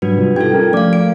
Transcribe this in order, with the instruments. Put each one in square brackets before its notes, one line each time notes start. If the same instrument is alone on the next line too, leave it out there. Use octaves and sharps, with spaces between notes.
[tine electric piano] G#2 G3 [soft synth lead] F#3 [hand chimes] D4 F#4 B4
[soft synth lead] C3 [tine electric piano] G3 F4
[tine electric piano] D#4 F4 G4 [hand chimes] A4 G#6 [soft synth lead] G5
[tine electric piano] C#4 [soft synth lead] A#4
[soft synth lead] F3 [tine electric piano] A3 D6 [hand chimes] D5 F5
[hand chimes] D7